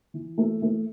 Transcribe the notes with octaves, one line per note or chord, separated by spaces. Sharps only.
E3
A3
A3